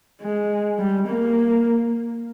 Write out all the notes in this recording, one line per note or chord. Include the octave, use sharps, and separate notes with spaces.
G#3
G3
A#3